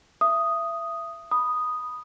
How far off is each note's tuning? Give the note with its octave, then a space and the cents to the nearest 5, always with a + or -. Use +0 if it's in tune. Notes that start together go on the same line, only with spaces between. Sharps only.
E5 +30 D#6 +0
B5 +0 D#6 -5